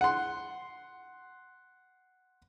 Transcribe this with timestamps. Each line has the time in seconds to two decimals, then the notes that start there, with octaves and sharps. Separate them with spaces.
0.01 F#5 C6